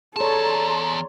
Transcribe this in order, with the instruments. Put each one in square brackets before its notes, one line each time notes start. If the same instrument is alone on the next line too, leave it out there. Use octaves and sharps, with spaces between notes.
[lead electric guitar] E2 A5 [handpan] G#4 C#5 [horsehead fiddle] A4 [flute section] D5 A#5 C6